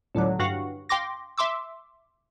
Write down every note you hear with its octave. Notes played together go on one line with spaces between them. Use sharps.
C#2 A2 D3 F#3
G2 F#4 F5 F#5
F5 G5 C6 D6 A#6
E5 C6 D6 E6